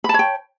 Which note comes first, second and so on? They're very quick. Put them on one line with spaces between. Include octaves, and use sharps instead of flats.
B5 A5 C#5 G5